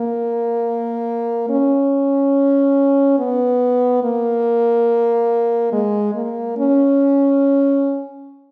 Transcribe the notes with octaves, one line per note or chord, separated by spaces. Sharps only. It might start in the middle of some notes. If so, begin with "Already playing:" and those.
Already playing: A#3
C#4
B3
A#3
G#3
A#3
C#4